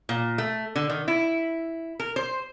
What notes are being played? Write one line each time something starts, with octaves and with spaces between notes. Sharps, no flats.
A#2
A3
D3
D#3
E4
A#4
C5